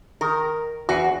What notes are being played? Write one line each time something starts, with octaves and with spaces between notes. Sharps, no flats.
D#3 A#4
E2 F#4